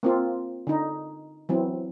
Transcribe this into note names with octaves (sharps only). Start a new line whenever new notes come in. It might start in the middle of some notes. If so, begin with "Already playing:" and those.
A#3 C4 F4
D3 D#4
E3 F#3 C4